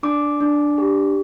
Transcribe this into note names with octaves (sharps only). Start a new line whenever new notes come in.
D4 D6
D4
G4